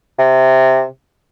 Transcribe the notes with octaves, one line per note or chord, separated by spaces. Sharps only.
C3